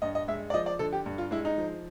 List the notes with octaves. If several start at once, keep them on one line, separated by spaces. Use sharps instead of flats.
G2 D#5
D#5
G#3 E5
D5
F3 D#5
D5
D3 A4
G4
G2
F4
G#3 E4
D#4
F3